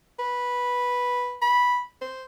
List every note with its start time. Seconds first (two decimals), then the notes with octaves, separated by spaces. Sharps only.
0.19 B4
1.42 B5
2.02 C5